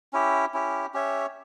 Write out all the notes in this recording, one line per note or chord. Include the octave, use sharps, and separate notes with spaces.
C#4 E4 G4
C#4 E4 G4
C#4 G4 C#5 E5